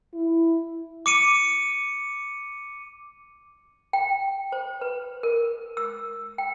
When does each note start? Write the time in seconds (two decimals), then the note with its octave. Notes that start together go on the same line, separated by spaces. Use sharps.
0.14 E4
1.06 D6 C#7 D#7
3.93 G5
4.52 C5
4.81 B4
5.23 A#4
5.77 E6
6.38 G5